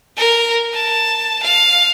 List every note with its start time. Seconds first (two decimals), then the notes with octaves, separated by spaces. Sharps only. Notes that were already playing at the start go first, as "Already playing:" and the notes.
0.17 A#4
0.74 A5
1.43 F5